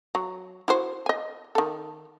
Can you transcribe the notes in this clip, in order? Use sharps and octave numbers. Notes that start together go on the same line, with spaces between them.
F#3
E4 F#4 C5
D#5 G#5
D#3 A4